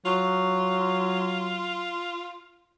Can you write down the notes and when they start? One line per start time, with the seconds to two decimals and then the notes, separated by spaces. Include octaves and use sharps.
0.06 F#3 F4